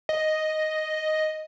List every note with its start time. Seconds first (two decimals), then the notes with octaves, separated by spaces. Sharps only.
0.09 D#5